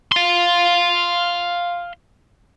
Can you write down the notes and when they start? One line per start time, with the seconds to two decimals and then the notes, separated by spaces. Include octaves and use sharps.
0.12 F5 C6